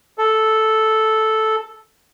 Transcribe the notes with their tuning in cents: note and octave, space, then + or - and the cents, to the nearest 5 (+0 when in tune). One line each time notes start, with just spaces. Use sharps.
A4 -5